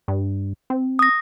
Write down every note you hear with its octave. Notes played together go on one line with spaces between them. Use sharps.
G2
C4
D#6 A#6